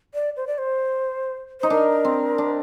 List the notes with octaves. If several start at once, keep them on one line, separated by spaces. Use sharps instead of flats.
D5
C5
D5
C5
D#4 C5
D4 A#4
C4
D4